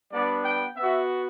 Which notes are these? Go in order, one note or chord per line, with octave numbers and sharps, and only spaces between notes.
G3 B3 D4 D5
G5
B3 F#4 E5